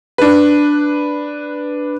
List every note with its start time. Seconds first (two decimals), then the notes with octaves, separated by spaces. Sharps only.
0.18 D4 B4